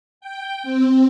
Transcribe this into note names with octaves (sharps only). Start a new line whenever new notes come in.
G5
C4